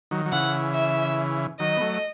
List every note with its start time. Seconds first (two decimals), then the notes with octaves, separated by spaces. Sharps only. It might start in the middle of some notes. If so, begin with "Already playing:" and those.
0.11 D#3 F#3
0.26 F#3
0.32 C#3 E3 F#5
0.75 E5
1.60 D#3 F#3 D#5
1.77 B3
1.80 F#3 A3